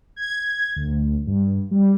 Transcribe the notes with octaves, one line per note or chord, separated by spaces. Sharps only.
G#6
D2
G2
G3